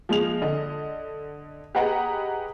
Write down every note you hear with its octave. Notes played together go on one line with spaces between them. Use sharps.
F3 G#3 G#4 F7
D3 D#5
G4 G#4 B4 D#5 F#5 A#5